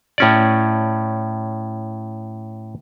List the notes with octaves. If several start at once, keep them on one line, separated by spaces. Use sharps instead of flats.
A2 C#4 D5